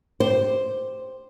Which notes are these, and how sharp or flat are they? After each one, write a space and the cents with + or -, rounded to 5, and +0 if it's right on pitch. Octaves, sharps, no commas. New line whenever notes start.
G4 +0 C5 +0